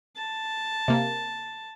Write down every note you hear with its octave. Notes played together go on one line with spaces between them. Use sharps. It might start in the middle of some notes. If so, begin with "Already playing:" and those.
A5
C3 A#3